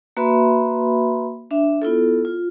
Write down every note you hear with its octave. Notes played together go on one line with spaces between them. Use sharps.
A#3 F#4 B4 E5 B5 C6
D4 E5
B3 E4 F4 A4
F4